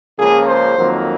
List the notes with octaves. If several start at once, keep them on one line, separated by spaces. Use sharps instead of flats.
C#2 C#3 F3 A#3 G#4
C5
F2 D#3 F#3 A#3